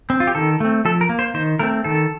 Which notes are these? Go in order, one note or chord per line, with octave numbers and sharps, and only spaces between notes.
C4
F4
G4
D#3 A4
A3 C4
F3 A4
A#4
A#3
C5
D#3 C5
A3 C4 A#4
D#3 A4